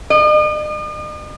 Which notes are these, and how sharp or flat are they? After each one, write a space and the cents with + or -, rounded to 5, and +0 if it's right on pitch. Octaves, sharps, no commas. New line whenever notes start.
D#5 -45